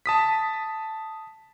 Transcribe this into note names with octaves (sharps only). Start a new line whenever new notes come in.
A5 D#6 B6